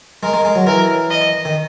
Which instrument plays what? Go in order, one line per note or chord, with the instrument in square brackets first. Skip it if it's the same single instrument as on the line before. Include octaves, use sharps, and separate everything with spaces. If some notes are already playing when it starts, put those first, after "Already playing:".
[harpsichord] G#3 [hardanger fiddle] A#4
[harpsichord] G#3
G#3
F#3
[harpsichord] E3 [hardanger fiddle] A#4
[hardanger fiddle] D#5
[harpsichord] D#3